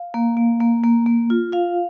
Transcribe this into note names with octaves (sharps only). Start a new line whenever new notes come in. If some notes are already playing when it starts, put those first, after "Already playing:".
Already playing: F5
A#3
A#3
A#3
A#3
A#3
F4
F4 F5